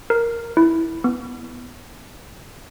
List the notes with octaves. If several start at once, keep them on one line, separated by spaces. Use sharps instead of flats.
A#4
E4
B3